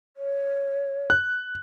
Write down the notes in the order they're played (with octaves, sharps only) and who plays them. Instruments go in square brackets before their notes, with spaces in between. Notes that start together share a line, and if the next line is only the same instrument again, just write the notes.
[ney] C#5
[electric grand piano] F#6